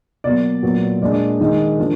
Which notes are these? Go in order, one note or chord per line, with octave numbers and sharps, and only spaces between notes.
B2 F#3 A#3 D5
A#2 F#3 B3
A#2 G#3 D4 D5
D5
D#3 G#3 D#4
F3 A#3 D4